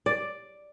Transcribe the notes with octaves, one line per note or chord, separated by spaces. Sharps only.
D5